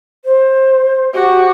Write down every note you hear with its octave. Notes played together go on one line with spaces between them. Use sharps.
C5
F#4 G4